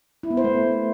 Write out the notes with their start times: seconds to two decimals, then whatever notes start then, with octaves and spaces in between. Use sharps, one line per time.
0.23 E4
0.30 B3
0.37 C5
0.44 A3